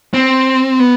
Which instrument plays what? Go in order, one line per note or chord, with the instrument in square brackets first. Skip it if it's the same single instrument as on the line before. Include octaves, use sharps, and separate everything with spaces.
[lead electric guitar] C4
B3